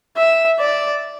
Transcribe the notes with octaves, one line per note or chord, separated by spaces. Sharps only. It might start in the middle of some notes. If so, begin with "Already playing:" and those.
E5
D5